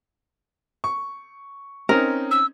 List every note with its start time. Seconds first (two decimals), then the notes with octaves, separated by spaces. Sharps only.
0.84 C#6
1.89 C4 C#4 D#4 A#4
2.31 E6